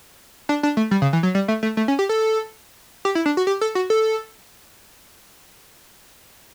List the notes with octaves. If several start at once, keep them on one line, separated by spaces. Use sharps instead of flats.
D4
D4
A3
G3
C#3
E3
F#3
G3
A3
A3
A3
C#4
G4
A4
G4
E4
D4
F#4
G4
A4
F#4
A4